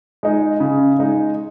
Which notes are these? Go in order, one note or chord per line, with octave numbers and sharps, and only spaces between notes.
G#3 D#4
C#3
G#3 D#4